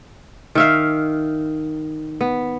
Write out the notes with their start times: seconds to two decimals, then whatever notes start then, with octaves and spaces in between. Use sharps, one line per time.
0.55 D#3 E5 F5
2.21 B3